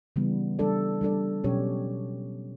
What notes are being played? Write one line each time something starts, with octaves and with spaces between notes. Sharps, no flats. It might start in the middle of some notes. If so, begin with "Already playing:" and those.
C#3 E3 G3 B3
G3 D4 A4 D5
G3 D4 A4 D5
B2 F#3 C#4 G4 C#5